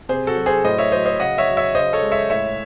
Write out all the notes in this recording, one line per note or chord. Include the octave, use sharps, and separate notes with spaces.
C3 G#4 C5
F#4 A4
F#3
G#4 C5
A2 C5 D#5
C#5 E5
F#3 C5 D#5
C5 D#5
C#3 D#5 F#5
C#5 E5
F#3
C#5 E5
C#3 C5 D#5
A4 C#5
G#3
C#5 E5
A2 C#5 E5